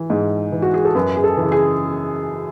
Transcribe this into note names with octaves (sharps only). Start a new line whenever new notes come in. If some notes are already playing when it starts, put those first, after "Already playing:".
Already playing: E3
G#2
E3
F#4
G#4
A4
F#2 B4
G#4
A4
E3
C#3
G#4